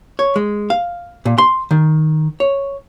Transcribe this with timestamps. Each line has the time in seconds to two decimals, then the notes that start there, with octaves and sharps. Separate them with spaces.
0.19 C#5
0.36 G#3
0.70 F5
1.25 A#2
1.38 C6
1.71 D#3
2.40 C#5